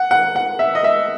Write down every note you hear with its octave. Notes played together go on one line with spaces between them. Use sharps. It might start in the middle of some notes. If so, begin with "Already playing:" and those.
Already playing: F#5
F#5
F#5
E5
D#5
E5